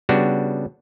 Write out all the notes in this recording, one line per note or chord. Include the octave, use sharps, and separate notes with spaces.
C#3 G3 B3 D4 F#4